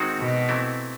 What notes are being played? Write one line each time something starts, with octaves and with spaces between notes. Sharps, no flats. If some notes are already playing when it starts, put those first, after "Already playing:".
Already playing: D#3 G#3 C4 D#4 F#4
B2
C3 E3 A3 C4 E4